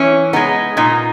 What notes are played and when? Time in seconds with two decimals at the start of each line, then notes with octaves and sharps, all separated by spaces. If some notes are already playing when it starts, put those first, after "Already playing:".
Already playing: E3 C#4
0.33 G#3 B3 D#4
0.77 A#2 D#4